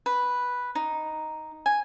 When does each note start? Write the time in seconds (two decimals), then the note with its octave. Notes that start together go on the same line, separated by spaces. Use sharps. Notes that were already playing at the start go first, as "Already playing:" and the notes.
0.06 B4
0.75 D#4
1.66 G#5